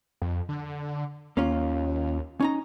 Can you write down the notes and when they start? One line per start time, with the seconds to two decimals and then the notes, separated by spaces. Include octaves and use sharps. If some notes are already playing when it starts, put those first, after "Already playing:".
0.22 F2
0.49 D3
1.37 D#2 A#3 C#4 F4
2.40 C#4 D#4 A#5